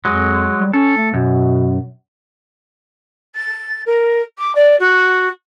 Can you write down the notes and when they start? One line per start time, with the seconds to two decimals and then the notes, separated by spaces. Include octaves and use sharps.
0.05 F2 F#3 G#3
0.60 G3
0.73 C#4 A4
0.97 A3
1.14 F#2 B2
3.35 A6
3.86 A#4
4.38 D6
4.55 D5
4.79 F#4